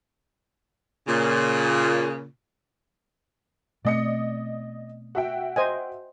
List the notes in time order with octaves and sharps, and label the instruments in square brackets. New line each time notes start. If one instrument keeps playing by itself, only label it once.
[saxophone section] A#2 C#3
[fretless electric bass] B2 A3 C4 [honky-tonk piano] D5 D#5 C#7
[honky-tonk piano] F#4 E5 G5
[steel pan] C5 D#5 G#5